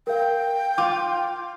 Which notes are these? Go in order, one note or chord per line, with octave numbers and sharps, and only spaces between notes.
A#4 F5 G5
F4 D6